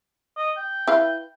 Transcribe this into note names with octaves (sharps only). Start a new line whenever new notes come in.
D#5
G5
E4 B4 F5